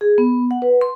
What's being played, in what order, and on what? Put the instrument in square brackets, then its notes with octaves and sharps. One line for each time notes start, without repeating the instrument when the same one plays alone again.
[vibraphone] G#4
B3
F#5
B4
C6